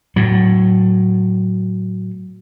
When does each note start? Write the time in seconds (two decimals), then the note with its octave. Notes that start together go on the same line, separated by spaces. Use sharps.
0.16 A2 F#3